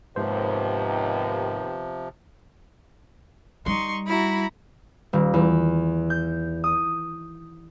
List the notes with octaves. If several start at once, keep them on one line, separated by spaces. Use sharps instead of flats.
D#2 G#2 C3 F3 B3 C5
G3 D#4 C6 C#6
E4 F#4 A#5 B5
D#1
E2
G6
D#6